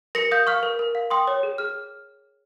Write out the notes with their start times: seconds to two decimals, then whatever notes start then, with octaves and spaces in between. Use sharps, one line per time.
0.15 A#4 A#6 C#7
0.31 F5 D#6 G6
0.47 F5 C#6 F6
0.63 A#4
0.79 A#4
0.95 F5
1.10 G5 C6 D#6
1.27 C#5
1.43 G#4
1.58 G#4 F6